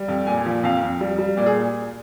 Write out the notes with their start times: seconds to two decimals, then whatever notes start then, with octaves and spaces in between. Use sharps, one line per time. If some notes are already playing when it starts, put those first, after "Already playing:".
Already playing: G3
0.08 F2
0.27 A#2 G#5
0.46 F3
0.63 F2 F5
0.83 F2
1.01 G3
1.18 G3
1.37 A#2 D5
1.46 G#4